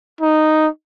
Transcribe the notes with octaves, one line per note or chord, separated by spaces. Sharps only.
D#4